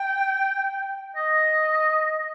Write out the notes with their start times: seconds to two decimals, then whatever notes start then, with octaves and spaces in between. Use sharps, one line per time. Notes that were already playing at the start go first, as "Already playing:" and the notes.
Already playing: G5
1.16 D#5